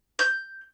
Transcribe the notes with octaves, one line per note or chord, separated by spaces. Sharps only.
G6